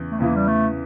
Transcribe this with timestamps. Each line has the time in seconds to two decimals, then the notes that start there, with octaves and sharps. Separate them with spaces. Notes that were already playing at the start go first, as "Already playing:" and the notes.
Already playing: E2 C#3 E3
0.12 A3
0.20 E2 C#3 E3 A#3
0.36 G3
0.48 A3